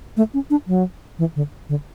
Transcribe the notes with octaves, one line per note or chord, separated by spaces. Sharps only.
A3
C#4
D4
F#3
E3
D3
D3